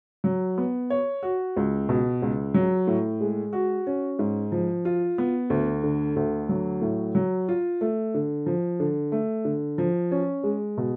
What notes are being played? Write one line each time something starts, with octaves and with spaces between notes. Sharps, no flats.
F#3
B3
C#5
F#4
C#2
B2
C#2
F#3
A2
G#3
F#4
C#4
G#2
F3
F4
B3
D2
D3
D2
F#3
A2
F#3
F4
A3
D3
F3
D3
A3
D3
F3
C#4
G#3
B2